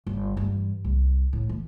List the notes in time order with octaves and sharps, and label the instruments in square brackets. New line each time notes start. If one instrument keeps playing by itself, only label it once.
[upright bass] G1
G2 E3
C2
A2
E3